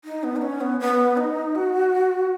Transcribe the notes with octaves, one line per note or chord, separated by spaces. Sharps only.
D#4
B3
D#4
C#4
B3
B3
D#4
F#4